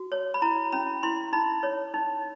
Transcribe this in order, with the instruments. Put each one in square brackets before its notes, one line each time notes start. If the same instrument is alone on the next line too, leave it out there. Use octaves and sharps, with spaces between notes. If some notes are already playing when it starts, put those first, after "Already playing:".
Already playing: [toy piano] F#4
C#5
B5
E4 A#5
C#4 B5
E4 C6
D#4 B5
C#5
D#4